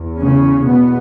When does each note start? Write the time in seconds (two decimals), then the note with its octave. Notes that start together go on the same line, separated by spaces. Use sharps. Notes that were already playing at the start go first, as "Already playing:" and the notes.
Already playing: E2
0.21 C#3 C#4
0.68 B2 B3